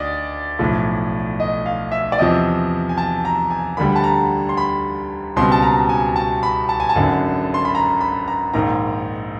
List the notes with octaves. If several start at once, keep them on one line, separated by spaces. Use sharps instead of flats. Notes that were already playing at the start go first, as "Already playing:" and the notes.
Already playing: D2 D5 D#5
B1 A2 F3
D#5
F5
E5
D5
E2 C3 F3 D#5
G#5
A5
A#5
G#5
D2 D3 G3 B5
A5
A#5
C6
B5
C#2 B2 G3 C4 C6
A5
A#5
G#5
A5
B5
A5
G#5
A5
G#1 F#2 D3
C6
B5
A#5
B5
A#5
A#1 G#2 D#3 A#5